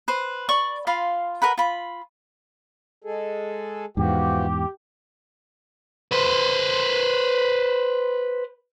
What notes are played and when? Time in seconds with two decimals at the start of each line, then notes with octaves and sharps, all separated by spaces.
0.08 B4 C5
0.49 D5 B5 C#6
0.87 F4 F5 B5 C6
1.42 A#4 B4 F#5 B5
1.58 F4 B5
3.04 G#3 G#4 A4
3.97 E2 G#2 E3 F3 F#4 G4
6.11 B4 C5